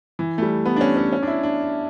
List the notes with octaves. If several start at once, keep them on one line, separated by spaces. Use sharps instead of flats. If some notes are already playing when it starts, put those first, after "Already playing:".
E3
A3
G3
B3
D4
C#4
C#4
C#4
D4
E4
D4